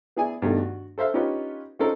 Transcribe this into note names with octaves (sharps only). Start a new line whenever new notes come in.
B3 E4 G#4 D5 G#5
G2 B2 D#3 A3
F#4
A4 C5 E5 F5
C#4 D#4 F4 G4 B4 C#5
C4 C#4 D#4 F4 A4 A#4